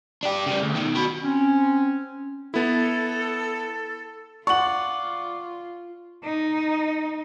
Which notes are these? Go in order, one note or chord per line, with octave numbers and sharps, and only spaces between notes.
D4 G4
C#3 G3
D2
B2 D#3
F#4 B5
C4 C#4
B3 E4 A4
F4 D5 F#5 C#6 F#7
D#4